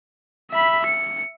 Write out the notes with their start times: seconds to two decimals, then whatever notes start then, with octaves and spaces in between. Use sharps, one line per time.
0.51 E5 B5
0.86 C#7